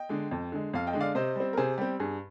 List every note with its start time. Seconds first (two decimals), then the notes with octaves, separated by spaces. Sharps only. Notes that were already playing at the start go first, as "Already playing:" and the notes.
Already playing: D#5 G5
0.09 D3 G#3
0.31 F2
0.52 D3 G#3
0.73 F2 F5
0.87 D#5 G5
0.93 D3 G#3
1.00 D5 F5
1.15 C3 C5 D#5
1.36 G3 C4
1.53 A#4
1.57 C3 G#4 C5
1.78 G3 C4 G4
1.99 G2 G#4